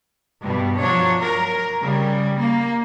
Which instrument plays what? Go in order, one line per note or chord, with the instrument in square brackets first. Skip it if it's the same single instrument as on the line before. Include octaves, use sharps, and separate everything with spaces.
[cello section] G2 B2 G3
F3 F#3 D4 C#5
A#4
C#3 G3
A#3